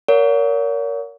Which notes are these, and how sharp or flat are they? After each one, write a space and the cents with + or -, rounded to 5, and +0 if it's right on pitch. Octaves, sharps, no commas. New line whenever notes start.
A#4 +0 C#5 +35 F#5 -45